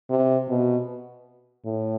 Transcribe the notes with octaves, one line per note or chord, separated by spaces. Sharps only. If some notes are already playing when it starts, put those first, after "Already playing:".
C3
B2
A2